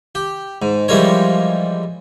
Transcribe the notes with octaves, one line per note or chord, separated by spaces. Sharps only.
G4
G#2
E3 F3 G3 G#3 A#4 C#5